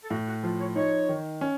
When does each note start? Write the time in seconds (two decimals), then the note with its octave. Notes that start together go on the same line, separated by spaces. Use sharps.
0.04 A4
0.10 A2 F#4
0.27 F#4
0.43 F3 F4
0.60 C#5
0.76 D#4 C#5
1.09 D#3
1.41 C#4